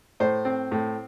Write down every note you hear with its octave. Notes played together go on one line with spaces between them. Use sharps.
A2 C5
C4
A2